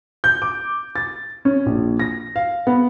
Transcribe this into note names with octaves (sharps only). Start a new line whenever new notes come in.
G6
D6
A6
C#4
A#1
A#6
F5
B3